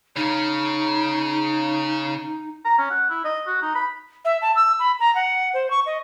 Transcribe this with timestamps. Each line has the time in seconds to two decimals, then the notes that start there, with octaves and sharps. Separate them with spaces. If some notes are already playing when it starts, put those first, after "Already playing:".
0.16 C#3 C#4 D#4
2.65 A#5
2.78 C#4
2.90 F#5
3.10 E4
3.25 D#5
3.47 F#4
3.62 D#4
3.75 B5
4.25 E5
4.42 A5
4.56 E6
4.79 B5
5.00 A#5
5.15 F#5
5.54 C5
5.70 C#6
5.86 D#5